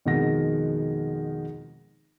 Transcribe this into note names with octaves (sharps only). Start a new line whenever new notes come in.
F2 B2 D#3 G#3 F#5 A#6